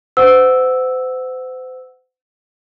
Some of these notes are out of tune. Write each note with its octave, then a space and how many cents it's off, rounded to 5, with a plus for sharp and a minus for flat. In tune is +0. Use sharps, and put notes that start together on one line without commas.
C5 -35 F#5 +0 E6 -5